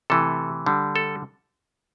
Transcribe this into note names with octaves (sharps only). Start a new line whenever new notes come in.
C3 E3 A3 A4
D3 G3
A4